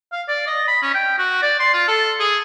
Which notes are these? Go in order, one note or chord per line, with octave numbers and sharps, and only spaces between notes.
F5
D5
D#5
B5
C#4
G5
F#4
D5
C6
F4
A4
G#4